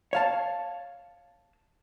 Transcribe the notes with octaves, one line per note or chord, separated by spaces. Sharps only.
C#5 F5 A5